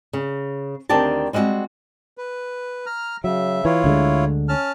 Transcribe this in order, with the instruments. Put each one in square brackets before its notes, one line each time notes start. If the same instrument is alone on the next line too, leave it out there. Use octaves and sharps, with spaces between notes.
[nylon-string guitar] C#3
D2 D#3 C4 D4 G4 A5
G3 G#3 C4 D#4 F#4
[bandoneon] B4
A#5 F6
[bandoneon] C#3 E5 [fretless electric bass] F#3
[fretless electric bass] E3 [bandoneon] E4 F4 C#5
[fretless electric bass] D2 D3 G#3
[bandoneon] C#4 A5 F6